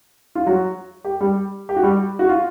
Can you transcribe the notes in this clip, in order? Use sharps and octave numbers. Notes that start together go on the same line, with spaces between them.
F4
F#3 F#4
G4
G3 G4
G4
F#4
G3 G4
F#4
F4